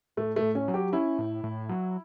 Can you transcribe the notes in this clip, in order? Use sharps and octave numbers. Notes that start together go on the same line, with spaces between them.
A2 A3
A3
A2
C#4
F#3
G4
C#4 E4
A2
A2
F#3